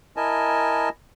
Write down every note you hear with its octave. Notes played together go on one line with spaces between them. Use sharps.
E4 A#4 D#5 G#5 A5